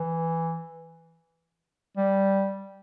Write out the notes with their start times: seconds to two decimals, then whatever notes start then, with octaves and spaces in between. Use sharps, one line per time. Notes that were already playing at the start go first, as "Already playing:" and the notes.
Already playing: E3
1.97 G3